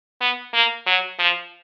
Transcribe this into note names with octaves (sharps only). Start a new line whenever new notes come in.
B3
A#3
F#3
F3